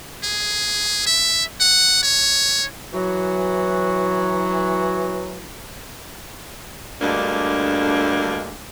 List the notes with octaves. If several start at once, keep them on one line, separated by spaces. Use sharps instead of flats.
G#4
E5
F#5
C#5
E3 F#3 F#4
D2 G2 D3 G#3 A#3